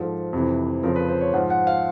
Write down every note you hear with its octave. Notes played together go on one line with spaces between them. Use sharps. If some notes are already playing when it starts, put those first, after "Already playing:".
Already playing: G#2 F3 A4
F2 C3 E3
F2 C#3 F3 A#4
B4
C5
C#5
G#2 F3 F#5
F#5
F5